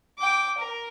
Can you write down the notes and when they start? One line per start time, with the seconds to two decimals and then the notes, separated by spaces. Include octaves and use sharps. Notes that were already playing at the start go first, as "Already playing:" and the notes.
0.18 G5 D6
0.58 A#4